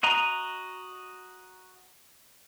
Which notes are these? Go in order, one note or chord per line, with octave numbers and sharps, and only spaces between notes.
F#4 D#5 A#5